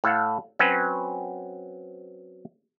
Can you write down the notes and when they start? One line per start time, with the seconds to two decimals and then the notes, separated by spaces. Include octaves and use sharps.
0.04 A2 A4 F5 F#5
0.59 F#3 C4 C#4 F#4 B4